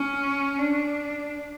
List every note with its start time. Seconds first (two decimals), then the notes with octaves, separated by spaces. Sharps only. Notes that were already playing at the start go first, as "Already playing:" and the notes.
Already playing: C#4
0.58 D4